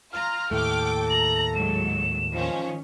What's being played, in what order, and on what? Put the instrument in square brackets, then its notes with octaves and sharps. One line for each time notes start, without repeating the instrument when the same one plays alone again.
[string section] F4 A#5 [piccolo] F6
[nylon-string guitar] D#2 A2 A3 [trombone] A4 [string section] G5 D6
[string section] A#5 [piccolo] F#7
[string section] G#2 F#3 [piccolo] E7
[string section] D#3 C#4 [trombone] F3